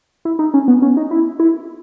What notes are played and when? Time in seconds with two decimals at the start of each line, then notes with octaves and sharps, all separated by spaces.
0.25 E4
0.39 D#4
0.54 C#4
0.68 B3
0.82 C#4
0.97 D#4
1.11 E4
1.40 E4